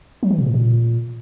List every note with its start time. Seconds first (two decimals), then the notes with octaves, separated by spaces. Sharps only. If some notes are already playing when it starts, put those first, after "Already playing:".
0.23 F#3
0.31 E3
0.38 B2
0.46 A2
0.54 A#2